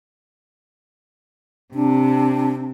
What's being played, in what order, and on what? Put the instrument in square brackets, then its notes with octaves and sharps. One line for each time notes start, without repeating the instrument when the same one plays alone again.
[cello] C3 [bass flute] D4